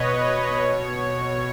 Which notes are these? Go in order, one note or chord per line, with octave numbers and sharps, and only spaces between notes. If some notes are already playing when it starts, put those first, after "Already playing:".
Already playing: B2 B4 C#5 D#5
B2